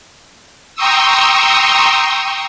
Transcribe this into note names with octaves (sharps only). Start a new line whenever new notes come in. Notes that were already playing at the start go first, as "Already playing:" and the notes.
G5 A#5 C6 C#6 D#6 E6